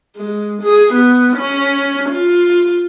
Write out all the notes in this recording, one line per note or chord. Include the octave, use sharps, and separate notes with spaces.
G#3
G#4
B3
C#4
F4